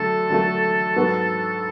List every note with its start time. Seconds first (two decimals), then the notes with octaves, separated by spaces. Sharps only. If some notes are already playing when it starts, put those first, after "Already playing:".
Already playing: D3 F#3 A3 A4
0.30 D3 F#3 A3
0.96 G#2 F#3 B3 F#4